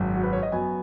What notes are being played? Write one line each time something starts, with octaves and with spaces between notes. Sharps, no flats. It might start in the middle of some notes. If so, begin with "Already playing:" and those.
Already playing: G#1 F#2 F#3
F#4
B4
C#5
D#5
F#2 F#3 B3 G#5